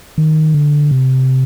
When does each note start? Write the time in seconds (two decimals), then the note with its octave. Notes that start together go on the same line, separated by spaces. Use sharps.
0.18 D#3
0.54 D3
0.91 C3